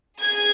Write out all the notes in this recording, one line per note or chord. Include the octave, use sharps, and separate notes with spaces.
G#4 G#6